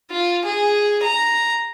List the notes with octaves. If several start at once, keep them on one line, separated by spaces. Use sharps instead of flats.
F4
G#4
A#5